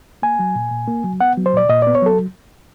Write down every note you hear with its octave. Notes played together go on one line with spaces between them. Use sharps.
A#3 G#5
F#3
A#2
A#2
A#3
F#3
B3 F#5
F#3
C5
A#2 D5
A#2 D#5
B3 D5
C#5
F#3 A4